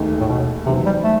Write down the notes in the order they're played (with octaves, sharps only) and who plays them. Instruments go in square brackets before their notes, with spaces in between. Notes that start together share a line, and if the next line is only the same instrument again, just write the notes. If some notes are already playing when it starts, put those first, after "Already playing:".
Already playing: [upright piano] E1 D#2 D#3 A3
[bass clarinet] A2
B2
[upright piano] E2 D#3 F#3 C4 [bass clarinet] C3
[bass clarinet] G3
A3